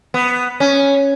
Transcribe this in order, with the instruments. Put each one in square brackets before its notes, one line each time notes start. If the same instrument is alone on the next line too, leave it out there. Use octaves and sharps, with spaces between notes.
[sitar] B3
C#4